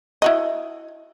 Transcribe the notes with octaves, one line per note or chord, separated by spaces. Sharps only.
E4 F#4 D#5